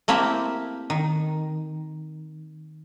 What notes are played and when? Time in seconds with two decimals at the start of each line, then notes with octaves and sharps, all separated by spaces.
0.08 A3 A#3 C4 E4 G4
0.90 D#3